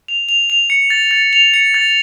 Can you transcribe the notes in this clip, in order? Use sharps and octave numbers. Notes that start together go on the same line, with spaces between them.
F7
F7
F7
C#7
A6
A6
F7
C#7
A6